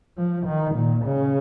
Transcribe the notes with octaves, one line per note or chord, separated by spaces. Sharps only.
F3
D#3
A#2
C#3